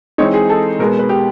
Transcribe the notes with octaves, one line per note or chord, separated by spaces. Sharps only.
E3 G#3 C4 D#4 C#5
G#4
A4
B2 G#3 B3 A#4
B4
G4